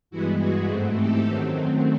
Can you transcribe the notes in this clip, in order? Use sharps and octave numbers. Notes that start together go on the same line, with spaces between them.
G2 E3 G#3 B3 E4 F#4
F#4 G#4
G#2 E3 A3 C4
G4 A4
F#2 D#3 F#3 A3 C4